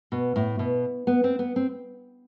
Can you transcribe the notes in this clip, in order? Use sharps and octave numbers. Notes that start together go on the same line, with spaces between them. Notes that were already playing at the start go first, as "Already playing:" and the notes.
B2
A2
B2
B3
C4
B3
C4